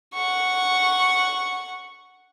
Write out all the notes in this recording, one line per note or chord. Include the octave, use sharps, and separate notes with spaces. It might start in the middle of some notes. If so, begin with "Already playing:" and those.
F#5 C#6